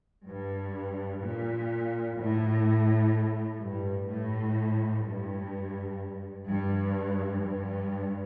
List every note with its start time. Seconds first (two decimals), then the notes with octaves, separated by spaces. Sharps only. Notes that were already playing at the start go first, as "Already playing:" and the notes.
0.27 G2
1.21 A#2
2.18 A2
3.61 G2
4.09 A2
5.05 G2
6.48 G2
7.43 G2